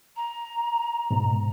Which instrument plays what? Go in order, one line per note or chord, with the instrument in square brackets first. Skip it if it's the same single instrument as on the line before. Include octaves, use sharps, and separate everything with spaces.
[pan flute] A#5
[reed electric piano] G#2 B2